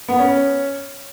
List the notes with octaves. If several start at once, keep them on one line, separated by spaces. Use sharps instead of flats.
B3
C#4